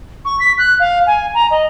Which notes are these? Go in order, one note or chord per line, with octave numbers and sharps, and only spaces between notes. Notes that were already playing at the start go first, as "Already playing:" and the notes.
C#6
B6
F#6
F5
G#5
A#5
D#5